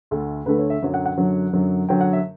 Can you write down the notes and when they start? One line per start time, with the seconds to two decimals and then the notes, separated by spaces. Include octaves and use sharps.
0.11 D2 D3 A3
0.46 D2 D3 A3 B4
0.59 C#5
0.70 E5
0.82 F#2 D3 F#3
0.94 F#5
1.06 F#5
1.18 F#2 D3 F#3
1.53 F#2 D3 F#3
1.89 F#2 D3 F#3 G5
2.01 F#5
2.13 E5